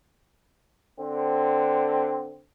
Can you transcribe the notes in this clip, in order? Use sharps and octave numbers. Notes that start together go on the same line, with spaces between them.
D3 C4